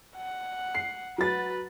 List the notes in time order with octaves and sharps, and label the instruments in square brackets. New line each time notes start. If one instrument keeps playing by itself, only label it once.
[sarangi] F#5
[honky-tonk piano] C7
[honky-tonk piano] F#3 A6 [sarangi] B4